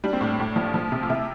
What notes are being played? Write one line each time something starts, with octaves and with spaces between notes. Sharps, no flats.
G3 D4
C4
A2 D4
A2
F3
F3
C3
F4
C3 E4